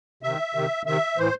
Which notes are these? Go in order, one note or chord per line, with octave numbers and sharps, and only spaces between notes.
C3 D#3 E5
C3 D#3
C3 D#3 E5
A2 E3 C5